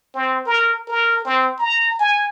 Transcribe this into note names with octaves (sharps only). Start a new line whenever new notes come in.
C4
A#4
A#4
C4
A#5
G#5